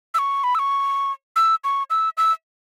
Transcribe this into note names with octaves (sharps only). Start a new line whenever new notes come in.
E6
C#6
B5
E6
C#6
E6
C#6
E6
E6